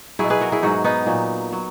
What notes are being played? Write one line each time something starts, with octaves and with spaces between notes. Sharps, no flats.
B2 F#3 E4 G#4
G#4 B4
F#4 A#4
E4 G#4
G#2 F#3 D#4 F#4
B3 D#4
A#2 F#3
F#3